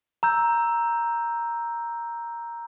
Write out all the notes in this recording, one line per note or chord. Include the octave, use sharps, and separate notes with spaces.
A#5 E6 G6